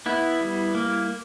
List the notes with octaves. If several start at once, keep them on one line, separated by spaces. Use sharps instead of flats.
B3 E4
G3
A#3